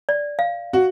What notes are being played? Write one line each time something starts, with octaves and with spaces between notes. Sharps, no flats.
D5
F5
F#4